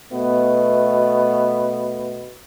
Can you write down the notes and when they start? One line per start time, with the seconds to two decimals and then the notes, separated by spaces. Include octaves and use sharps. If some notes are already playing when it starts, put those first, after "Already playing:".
0.12 B2 A3 B3